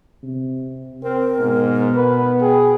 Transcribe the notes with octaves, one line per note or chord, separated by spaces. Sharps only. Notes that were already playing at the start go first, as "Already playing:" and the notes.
C3
C4 A#4
G#2 B2
B3 B4
G#4 G5